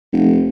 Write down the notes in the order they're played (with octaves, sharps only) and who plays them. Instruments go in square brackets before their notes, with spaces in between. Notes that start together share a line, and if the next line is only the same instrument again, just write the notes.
[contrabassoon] F1